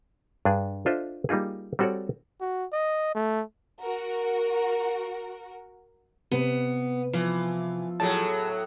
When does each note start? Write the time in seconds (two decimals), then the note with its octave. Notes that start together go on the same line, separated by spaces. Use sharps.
0.45 G2 D4 G#4
0.86 D4 F4 A4 C5 D#5 E5
1.29 G3 A#3 D#4 F4 G#4
1.79 G3 C4 F#4 A4 C#5 D5
2.40 F#4
2.72 D#5
3.15 A3
3.82 F#4 A#4
6.32 C3 B3
7.13 E3 F3
8.00 A2 F#3 G#4 A5